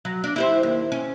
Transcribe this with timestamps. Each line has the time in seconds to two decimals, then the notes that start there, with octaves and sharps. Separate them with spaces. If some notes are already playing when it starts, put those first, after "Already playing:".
0.05 F#3
0.24 D4
0.36 E4 G4 C5
0.63 D#2
0.92 C#4